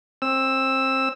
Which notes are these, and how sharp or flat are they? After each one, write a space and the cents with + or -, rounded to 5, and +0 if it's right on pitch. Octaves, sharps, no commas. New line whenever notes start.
C4 +25 E6 +0